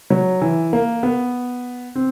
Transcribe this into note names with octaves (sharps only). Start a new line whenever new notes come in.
F#3
E3
A#3
B3
C4